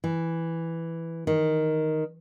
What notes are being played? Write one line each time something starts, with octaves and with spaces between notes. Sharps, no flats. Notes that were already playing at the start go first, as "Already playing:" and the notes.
E3
D#3